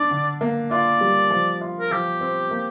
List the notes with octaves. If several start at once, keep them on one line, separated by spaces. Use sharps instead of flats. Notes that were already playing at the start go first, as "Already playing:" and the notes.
Already playing: D4 D5
D3
A#3
F4 D5
G3
F3
F4
A#4
F3 G4
C4
A#3